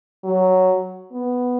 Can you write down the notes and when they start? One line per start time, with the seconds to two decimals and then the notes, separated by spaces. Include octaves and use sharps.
0.24 F#3
1.13 B3